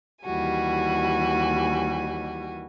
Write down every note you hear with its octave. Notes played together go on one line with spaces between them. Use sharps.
D#2 E3 G3 F#4 G#5